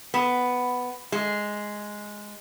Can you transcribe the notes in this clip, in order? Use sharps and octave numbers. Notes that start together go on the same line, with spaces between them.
B3
G#3